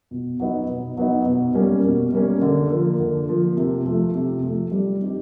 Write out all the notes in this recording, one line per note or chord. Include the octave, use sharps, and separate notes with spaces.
B2
F#3 B3 D#4
B2
F#3 B3 D#4
B2
G3 A#3 C#4
B2
G3 A#3 C#4
D3
F3 A#3
D3
F3 A#3
C3
F3 A3
C3
F3 A3
G3
C4 D#4 G4